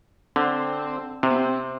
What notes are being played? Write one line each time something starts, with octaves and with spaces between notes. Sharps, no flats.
D3 C4
C3 C4
B3
C4